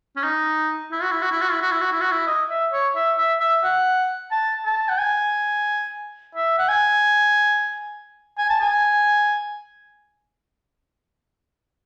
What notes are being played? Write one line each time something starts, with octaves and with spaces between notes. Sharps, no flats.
C#4
D#4
E4
F#4
E4
F#4
E4
F#4
E4
F#4
E4
F#4
E4
F#4
E4
D#5
E5
C#5
E5
E5
E5
F#5
A5
A5
F#5
G#5
E5
F#5
G#5
G#5
A5
G#5